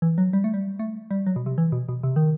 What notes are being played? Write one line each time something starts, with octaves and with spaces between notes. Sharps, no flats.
E3
F#3
G3
A3
G3
A3
G3
F#3
B2
C3
E3
B2
B2
C3
D#3